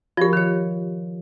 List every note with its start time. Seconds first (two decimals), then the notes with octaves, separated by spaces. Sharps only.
0.17 F3 F4 G4 A#4
0.33 D#3 C#5